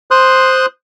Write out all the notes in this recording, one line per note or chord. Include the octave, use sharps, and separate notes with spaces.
C5 C6 D#6 F#6